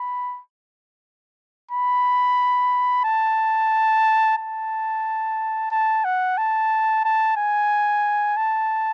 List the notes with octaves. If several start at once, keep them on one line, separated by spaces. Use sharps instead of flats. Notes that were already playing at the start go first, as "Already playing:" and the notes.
Already playing: B5
B5
A5
A5
A5
F#5
A5
A5
G#5
A5